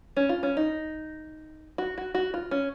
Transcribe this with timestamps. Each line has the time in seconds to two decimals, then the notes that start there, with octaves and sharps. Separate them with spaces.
0.17 C#4
0.29 F4
0.43 C#4
0.57 D#4
1.78 F#4
1.98 F#4
2.15 F#4
2.34 F4
2.51 C#4